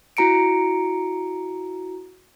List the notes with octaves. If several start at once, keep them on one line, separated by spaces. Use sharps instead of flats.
E4 F#4 A#5 C#7 D7